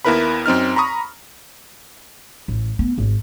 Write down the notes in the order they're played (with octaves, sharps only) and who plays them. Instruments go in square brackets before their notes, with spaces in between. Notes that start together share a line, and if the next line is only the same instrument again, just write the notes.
[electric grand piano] D#2 B3 E4 A#4 B4 B5
F#2 C4 D#4 F6
A#5 B5 C#6 D#6
[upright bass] A1
B3
G#1